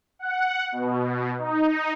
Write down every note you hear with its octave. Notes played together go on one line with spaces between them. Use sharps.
F#5
B2
D#4